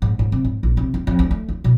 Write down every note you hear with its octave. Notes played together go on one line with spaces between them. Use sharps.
G#2
G#2
C3
G#2
A#1
C3
D#2
F2
D2
A3
D2
B2